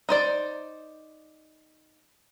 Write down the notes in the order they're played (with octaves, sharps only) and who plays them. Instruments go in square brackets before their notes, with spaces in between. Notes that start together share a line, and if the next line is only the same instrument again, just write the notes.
[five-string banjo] D#4 C5 D5